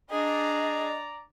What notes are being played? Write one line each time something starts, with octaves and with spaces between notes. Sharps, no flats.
D4 G#4 D5 D#5 A#5